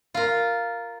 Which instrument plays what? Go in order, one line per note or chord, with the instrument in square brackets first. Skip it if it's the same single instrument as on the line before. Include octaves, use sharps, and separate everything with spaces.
[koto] F4 A#4